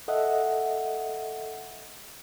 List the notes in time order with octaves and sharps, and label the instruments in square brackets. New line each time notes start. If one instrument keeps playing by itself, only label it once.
[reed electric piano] A4 D#5 E5 F#5